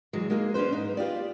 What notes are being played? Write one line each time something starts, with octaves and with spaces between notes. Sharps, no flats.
E2 E3 F#3 G#3
G#3 A#3 D#4 G#4
C#4 D4 F4 B4 C5
G#2 D#4
B3 F4 G4 D5